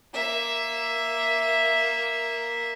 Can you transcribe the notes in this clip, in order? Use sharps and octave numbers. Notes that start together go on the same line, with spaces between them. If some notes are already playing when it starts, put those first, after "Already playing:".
A#3 E5